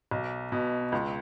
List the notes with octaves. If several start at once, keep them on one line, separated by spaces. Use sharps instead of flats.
B1
B2
C#2